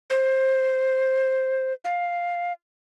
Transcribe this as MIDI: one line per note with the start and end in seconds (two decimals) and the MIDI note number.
0.10 1.73 72
1.85 2.53 77